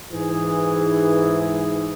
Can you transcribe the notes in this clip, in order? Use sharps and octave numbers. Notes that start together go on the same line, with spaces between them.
G#2 E3 G#4